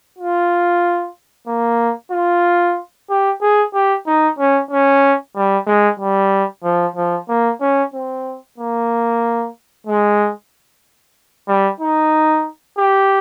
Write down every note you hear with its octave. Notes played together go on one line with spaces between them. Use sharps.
F4
A#3
F4
G4
G#4
G4
D#4
C#4
C#4
G3
G#3
G3
F3
F3
A#3
C#4
C4
A#3
G#3
G3
D#4
G4